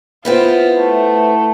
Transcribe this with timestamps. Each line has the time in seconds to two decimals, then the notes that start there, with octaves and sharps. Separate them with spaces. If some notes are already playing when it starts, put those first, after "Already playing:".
0.25 B3 C4 E4 F4
0.77 A3